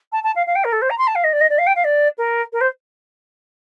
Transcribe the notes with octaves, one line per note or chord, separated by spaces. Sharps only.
A5
A5
F5
F5
G5
A#4
A4
C5
A#5
C6
A5
F5
D#5
D5
D#5
D5
F5
G5
F5
D5
A#4
A#4
C5